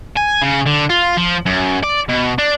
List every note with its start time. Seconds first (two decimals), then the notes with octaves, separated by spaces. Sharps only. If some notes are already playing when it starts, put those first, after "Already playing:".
0.17 G#5
0.43 C#3
0.67 D3
0.90 F4
1.17 F3
1.46 F#2
1.84 D5
2.09 B2
2.39 D4